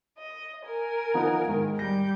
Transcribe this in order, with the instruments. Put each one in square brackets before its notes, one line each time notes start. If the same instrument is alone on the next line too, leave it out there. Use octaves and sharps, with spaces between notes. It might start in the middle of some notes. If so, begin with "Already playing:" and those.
[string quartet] D#5
A#4 G#5
[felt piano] F3 B3 D#4
G#2 D#3
[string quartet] G3 G4 G6 [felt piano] A#6